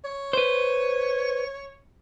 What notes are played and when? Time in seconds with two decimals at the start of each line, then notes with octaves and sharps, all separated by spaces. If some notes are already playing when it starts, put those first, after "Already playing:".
0.04 C#5
0.33 B4 C5